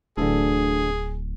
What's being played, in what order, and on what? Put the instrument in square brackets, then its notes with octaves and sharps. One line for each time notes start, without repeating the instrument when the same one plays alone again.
[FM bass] D1 [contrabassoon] D2 [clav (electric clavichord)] D3 E3 A4 [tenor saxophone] G#4